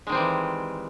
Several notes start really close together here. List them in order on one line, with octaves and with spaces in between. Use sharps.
G#3 D#3 C4 G3 E3